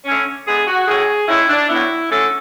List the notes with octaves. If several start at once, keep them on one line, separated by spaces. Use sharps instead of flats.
D3 A3 C#4
D3 G#3 B3 G#4
F#4
A2 F#3 C#4 G#4
A2 G#3 C#4 E4
D4
A2 F#3 B3 E4
D3 F#3 A3 C#4 A4